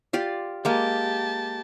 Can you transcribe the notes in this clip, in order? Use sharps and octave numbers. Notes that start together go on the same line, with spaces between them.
F4 G4 D5
G#3 A#3 G4 A5